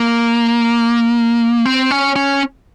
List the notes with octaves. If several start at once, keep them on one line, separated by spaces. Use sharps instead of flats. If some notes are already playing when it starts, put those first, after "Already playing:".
Already playing: A#3
C4
C#4
C#4